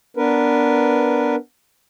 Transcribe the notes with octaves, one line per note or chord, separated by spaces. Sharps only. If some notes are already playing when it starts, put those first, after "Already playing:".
B3 D4 A#4 B4